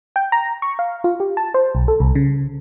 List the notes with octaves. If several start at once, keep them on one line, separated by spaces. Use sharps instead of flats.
G5
A#5
C#6
F5
F4
G4
A5
C5
B1
A4
C2
C#3